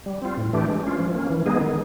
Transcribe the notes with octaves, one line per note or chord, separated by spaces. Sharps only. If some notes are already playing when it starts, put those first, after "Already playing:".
G3
C4 F4
A2
E3 A3 D4 G4
G#3
C#4 F4
F3
A#3 C#4
E3
G#3 B3 D#4 G#4
D#3